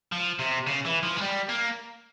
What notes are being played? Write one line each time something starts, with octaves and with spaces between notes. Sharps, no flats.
F3
C3
C#3
E3
F3
G#3
G3
A#3